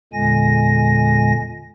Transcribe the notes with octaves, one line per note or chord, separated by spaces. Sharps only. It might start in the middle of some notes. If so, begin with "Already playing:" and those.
E2 A#2 D3 G#3 G#5 A#6